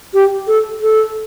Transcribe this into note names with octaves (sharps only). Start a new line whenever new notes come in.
G4
A4
A4